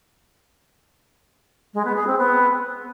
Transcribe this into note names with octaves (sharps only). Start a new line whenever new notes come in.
G#3
B3
G#4
C4
B3